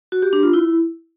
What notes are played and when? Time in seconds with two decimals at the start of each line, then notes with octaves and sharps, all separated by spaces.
0.12 F#4
0.22 G4
0.33 D4
0.43 F4
0.53 E4